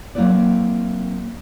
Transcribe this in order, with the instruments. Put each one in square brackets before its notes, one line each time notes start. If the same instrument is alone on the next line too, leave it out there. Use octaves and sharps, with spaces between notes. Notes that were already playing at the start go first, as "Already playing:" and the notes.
[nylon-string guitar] F#3 A#3 C4 E4 B4 D5